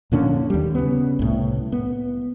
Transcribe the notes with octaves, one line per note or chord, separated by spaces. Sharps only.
F2 A#2 D3 C#4
D#2 G3
C#3 B3
C2 A2
B3